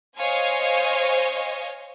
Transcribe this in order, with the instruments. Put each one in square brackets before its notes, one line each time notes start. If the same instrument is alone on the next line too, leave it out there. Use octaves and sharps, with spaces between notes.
[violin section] C5 C#5 D#5 F5 G#5